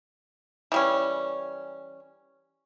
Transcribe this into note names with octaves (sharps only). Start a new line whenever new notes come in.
E3 G3 C#4